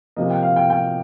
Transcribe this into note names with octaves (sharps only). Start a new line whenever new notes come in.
C3 F3 A#3 D#5
G5
F5
G5
G5